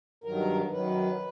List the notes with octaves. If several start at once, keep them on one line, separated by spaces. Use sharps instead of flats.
G2 D#3 F#3 A#4
F#2 D#3 F#3 B4